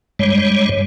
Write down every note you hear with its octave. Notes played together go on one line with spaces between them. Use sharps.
G2 G3 G#3 C#5